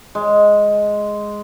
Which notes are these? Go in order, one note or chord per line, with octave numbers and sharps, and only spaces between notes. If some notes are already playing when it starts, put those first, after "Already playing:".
G#3